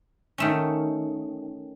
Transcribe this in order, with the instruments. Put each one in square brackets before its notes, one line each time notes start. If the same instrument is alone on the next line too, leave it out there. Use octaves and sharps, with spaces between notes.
[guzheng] D#3 A3 C#4